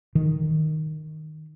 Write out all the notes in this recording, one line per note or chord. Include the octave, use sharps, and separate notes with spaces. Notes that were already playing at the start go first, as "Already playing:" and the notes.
D#3